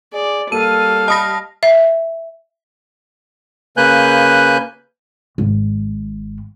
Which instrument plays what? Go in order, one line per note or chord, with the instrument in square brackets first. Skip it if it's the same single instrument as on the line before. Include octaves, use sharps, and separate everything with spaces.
[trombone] G#4 [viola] D5
[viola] G3 F5 [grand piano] A#3 [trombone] A4 [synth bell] D#7
[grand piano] D#5 B5 [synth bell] A5 D#6 A#6
[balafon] E5
[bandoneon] C#3 A#3 B4 G#5 F#6 G6
[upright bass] G#1